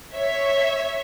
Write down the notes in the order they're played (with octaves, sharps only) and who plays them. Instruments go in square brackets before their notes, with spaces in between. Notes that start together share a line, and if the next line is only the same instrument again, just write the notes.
[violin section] C#5 E5